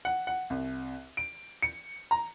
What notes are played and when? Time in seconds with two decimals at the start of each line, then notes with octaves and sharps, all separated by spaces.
0.05 F#5
0.27 F#5
0.50 C2
1.17 D7
1.63 C#7
2.11 A#5